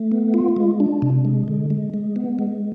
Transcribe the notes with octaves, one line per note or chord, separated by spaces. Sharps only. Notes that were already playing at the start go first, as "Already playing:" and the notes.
Already playing: A3
B3
F4
G#3
D4
C3
G#3
D3
G#3
G#3
B3
G#3